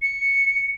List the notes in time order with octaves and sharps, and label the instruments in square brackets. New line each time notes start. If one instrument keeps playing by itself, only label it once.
[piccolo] C#7